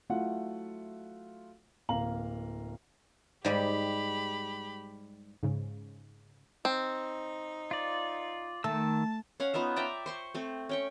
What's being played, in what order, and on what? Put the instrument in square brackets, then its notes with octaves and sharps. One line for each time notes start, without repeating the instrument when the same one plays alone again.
[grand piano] F#3 A3 E4 F4 F#5
D1 A#3 F5 A#5 F#7
[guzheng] G#2 G3 [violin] G4 B5
[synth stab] G#2 C#3
[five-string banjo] C4 [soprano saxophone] D#4
[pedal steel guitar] F4 D5
[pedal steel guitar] D#3 E6 [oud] A3 [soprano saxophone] A5
[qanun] C#4 F5 F#5
B3 D#4 F4 E5
D5 E5 G5 A#5
C5 C6 C#6
A3 C4
C#4 G5 C#6